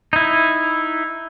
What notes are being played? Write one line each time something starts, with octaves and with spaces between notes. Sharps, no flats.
D#4 E4